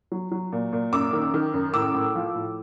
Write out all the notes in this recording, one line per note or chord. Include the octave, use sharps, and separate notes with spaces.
F#3
F#3
A#2
A#2
F#2 D6 E6
D#3
D#3
F#2
A2 D6 E6
A2
F3
A2